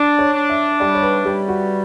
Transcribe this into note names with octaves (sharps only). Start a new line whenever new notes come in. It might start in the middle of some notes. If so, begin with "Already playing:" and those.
Already playing: D4 D5
C#5
D4
E5
G3 D5
C#5
B4
G3 G4
F#4